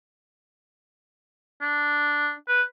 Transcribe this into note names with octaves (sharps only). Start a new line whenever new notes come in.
D4
B4